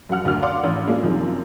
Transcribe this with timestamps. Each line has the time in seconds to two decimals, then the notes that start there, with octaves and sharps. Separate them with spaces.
0.09 F#2 F#4 F#5 F6
0.24 F#1 D2 F#4 F6
0.42 D5 F5 F#5 C6 D6
0.64 A1
0.87 G#3 A#3 C#4 D4 F4
1.03 F#2 C3 D#3 F3